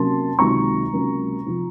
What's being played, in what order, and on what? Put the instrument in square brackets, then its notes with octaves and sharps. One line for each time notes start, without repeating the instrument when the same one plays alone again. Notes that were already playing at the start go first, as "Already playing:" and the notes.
Already playing: [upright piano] C3 F#3 A#3 C#4 A5 C6
C#2 C3 D#3 F#3 A#3 A#5 C#6
C#2 C3 F#3 A#3 C#4
C3 F3 C4